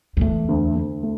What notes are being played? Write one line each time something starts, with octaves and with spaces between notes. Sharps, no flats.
F#2
E2 A3
D2
D2
A3